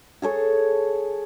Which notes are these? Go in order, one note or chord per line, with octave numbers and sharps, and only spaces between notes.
G#4 A4 C#5